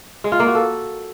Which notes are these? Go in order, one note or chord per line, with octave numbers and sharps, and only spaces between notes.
G#3
F4
A#3
F#4
A4